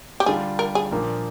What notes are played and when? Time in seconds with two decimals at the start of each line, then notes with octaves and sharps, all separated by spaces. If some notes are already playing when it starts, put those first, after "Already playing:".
0.20 G4
0.26 D3 G3 D4 F4 G#4
0.59 A#4
0.75 G#4
0.91 A#2 F3 A#3 D4